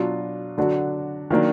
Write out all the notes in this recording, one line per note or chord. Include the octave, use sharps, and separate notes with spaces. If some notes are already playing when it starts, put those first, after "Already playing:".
Already playing: B2 F#3 D4 F4
D3 F#3 D4 F#4
D#3 F#3 A#3 D4